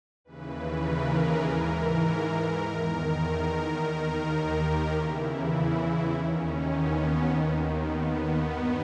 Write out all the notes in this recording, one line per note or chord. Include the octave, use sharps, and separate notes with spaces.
D#2 C#3 E3 B4
A#4
G#4
G#2 E3 A#4
E2 D#3
A#4
D#2 D#3 A#4
G4
E2 C#3 E3 E4
D#2 D#3 C#4
B3
D#2 D#3
B3
G2 D#3